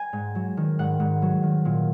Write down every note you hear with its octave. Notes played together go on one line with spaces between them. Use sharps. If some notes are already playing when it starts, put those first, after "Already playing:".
Already playing: G#5
G#2
F#3
D#3
G#2 F#5
G#2
F#3
D#3
A#2